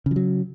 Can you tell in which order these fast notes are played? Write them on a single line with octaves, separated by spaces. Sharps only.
C#3 F3 F#3